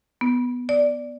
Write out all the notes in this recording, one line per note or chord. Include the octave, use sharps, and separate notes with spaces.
B3
D5